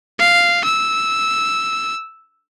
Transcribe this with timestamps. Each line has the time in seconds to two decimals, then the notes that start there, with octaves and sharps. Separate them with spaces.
0.19 F5
0.65 E6